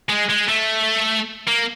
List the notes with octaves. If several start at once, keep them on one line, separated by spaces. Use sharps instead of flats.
G#3
G#3
A3
A#3